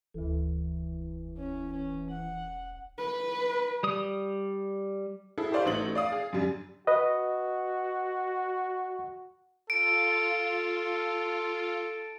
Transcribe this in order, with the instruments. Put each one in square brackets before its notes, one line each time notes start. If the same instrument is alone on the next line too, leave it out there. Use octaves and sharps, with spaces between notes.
[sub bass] E1 [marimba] D2 A4 [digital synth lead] E3
[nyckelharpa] C#4
C#4
F#5
[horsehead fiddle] B4
[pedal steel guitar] G3 D#6
[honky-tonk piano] E4 G#4 A4
G4 B4 C5 D5 F5 C6
A1 A3 D#4 F#4 F#7
D5 F5 D#6
G#4 F5
F#2 D3 G3
[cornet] F#4 [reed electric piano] B4 D#5
[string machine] F4 [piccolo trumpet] A4 [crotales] D7